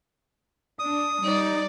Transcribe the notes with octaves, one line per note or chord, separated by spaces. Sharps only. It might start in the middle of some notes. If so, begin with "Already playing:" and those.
D4 D#6
G3 D#4 D5